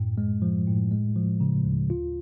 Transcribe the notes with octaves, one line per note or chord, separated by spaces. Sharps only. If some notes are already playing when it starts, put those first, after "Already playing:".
Already playing: F#2 A2
G#3
F3
A2
G#3
F3
C#3
D2
F4